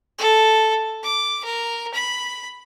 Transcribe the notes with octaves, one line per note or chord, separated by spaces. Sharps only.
A4
D6
A#4
B5